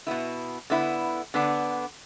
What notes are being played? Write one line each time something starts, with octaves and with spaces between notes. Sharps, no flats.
B2 B3 E4
D3 B3 E4
D3 B3 D4